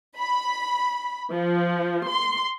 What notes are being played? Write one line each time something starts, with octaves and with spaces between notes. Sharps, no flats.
B5
F3
C6